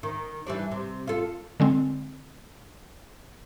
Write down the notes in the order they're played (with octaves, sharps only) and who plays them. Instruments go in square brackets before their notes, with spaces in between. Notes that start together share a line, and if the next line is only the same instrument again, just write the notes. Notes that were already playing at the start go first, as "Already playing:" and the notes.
[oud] D#3
E3 G3 D4
C3
F4 A4
[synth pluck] D3 G#3 C4